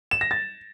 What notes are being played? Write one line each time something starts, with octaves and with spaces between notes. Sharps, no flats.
E7
A#6
A6